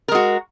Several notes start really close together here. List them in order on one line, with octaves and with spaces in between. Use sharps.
A#4 G#3 F#4